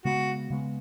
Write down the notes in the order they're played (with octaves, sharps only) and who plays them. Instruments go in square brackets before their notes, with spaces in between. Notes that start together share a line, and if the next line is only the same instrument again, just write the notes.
[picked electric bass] C#3 G#3 B3 [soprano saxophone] F#4
[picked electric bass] C#3 G#3 B3